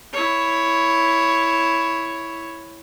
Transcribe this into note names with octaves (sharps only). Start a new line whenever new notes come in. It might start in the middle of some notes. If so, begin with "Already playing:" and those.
E4 C#5